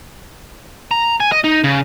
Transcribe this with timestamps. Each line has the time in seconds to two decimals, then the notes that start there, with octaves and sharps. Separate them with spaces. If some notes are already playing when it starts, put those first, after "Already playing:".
0.91 A#5
1.20 G#5
1.32 D#5
1.44 D#4
1.64 C#3